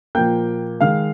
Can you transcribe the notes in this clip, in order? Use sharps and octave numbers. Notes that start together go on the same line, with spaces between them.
A#2 F3 A#3 G5 G6
D#3 G#3 F5 F6